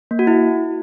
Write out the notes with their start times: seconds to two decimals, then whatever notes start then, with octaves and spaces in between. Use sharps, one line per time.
0.11 A#3
0.19 F#4
0.27 E4